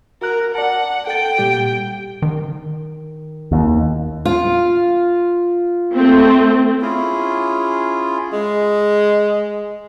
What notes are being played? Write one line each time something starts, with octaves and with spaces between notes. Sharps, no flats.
F#4 A#4 F#6
D5 F#5 A5
A4 F#5 G5 A6
A#2 G3 G4
D#3
D#2
F4
A3 C4
C#4 E4 F4 G#4
G#3